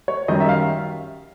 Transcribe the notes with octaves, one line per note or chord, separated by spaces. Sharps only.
C#5
F#2 D#3 G3 D#5
E5
F5